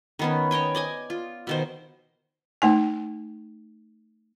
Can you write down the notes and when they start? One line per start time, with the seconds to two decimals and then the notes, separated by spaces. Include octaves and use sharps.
0.19 D#3 B3 C#4
0.51 C#5 D#5 G5 G#5
0.75 D5 D#5 G#5
1.10 F4
1.47 B2 D#3 C5
2.62 A3 D#4 G#5